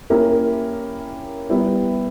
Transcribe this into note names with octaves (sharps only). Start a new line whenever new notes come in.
A#3 C#4 E4 G4 A#4
G3 B3 E4 G4